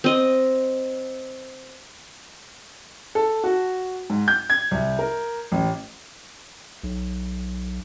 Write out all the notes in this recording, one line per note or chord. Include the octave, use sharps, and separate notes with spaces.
C4 D#5
A4
F#4
G#2
G6
G#6
C2
A#4
A1
B1